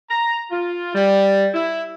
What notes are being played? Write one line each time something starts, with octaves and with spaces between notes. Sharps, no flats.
A#5
F4
G3
E4